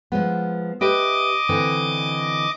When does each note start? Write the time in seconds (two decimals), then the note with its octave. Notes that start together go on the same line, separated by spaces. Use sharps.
0.12 F3 G#3 B3
0.81 G4 B4 D#5 E5 D6
1.49 D3 E3 C4